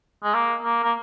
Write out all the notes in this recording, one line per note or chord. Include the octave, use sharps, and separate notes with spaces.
G#3
A#3
A#3
A#3